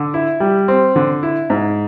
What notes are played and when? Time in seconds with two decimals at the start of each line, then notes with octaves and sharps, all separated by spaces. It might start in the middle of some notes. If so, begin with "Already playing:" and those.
Already playing: D3
0.14 E4
0.40 G3
0.68 C4
0.96 D3
1.23 E4
1.50 G#2